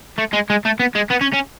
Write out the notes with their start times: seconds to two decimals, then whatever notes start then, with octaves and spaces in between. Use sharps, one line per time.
0.18 A3
0.33 G#3
0.50 G#3
0.65 A3
0.80 B3
0.95 G#3
1.11 B3
1.21 C#4
1.34 C#4